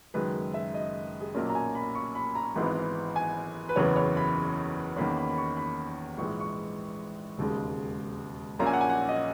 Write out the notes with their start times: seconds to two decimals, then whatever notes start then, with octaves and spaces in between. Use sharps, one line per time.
0.14 F#1 F#2 D#3 G#3 B4
0.54 E5
0.74 D#5
1.20 G#4
1.35 B1 A#2 A#3 C#4 A#4
1.50 A#5
1.55 G#5
1.75 B5
1.95 C#6
2.15 B5
2.35 A#5
2.56 G#1 G#2 E3 G#3 B3
3.16 G#5
3.69 B4
3.76 F#1 E2 C#3 E3 B3 C#5
3.96 C#5
4.17 B5
4.96 E2 D#3 A#3 C#4 B5
5.17 B5
5.30 B5
5.38 C#6
5.57 B5
6.18 A#1 G#2 E3 G#3 C#6
6.40 C#6
7.38 E1 D#2 C#3 G#3
8.59 A#1 A#2 A#3 C#4 A#5
8.67 G#5
8.73 F#5
8.81 G#5
8.89 F#5
9.09 D#5